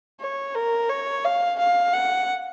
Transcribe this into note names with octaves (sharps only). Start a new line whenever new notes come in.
C#5
A#4
C#5
F5
F5
F#5